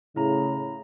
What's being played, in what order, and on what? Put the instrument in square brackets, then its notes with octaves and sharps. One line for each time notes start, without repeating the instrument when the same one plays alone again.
[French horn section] A2 C#3 [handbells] E4 A#5